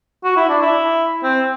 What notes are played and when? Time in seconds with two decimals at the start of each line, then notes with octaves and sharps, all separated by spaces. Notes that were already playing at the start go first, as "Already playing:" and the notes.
0.24 F#4
0.37 E4
0.49 D4
0.62 E4
1.23 C4